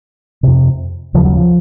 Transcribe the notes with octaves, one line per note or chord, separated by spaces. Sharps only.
F2 C3
D#2 C#3 F3
F#3
F3